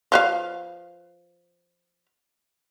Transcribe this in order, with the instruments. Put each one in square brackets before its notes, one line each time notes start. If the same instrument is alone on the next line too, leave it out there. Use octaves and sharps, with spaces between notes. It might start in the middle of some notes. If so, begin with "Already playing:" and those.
[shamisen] F3 B4 F5